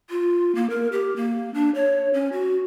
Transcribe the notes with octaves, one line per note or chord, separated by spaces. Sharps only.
F4
A#3
A#4
G4
A#3
D4
C#5
C#4
F#4